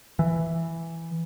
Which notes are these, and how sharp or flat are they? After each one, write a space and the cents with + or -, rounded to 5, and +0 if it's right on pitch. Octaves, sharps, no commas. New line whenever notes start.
E3 +0